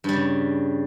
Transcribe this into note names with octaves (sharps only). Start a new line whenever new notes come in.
G2 C#3 G3